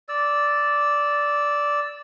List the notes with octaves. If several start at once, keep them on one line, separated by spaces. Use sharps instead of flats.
D5 E6